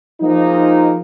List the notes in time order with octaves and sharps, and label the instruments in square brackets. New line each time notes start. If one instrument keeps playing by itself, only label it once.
[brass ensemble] F3 G#3 A#3 D#4